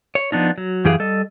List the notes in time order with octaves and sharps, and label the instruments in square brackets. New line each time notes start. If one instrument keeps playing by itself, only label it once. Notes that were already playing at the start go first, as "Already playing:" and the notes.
[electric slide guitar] C#5
F3 B3 D4 D#4
F#3
F#2 E3 G4 G#4 F5
G3 A4 D#5